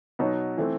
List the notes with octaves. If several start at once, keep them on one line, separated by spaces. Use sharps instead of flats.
B2 F#3 B3 D#4
E3 A3 C4